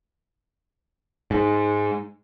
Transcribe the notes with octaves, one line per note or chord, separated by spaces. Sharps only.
G#2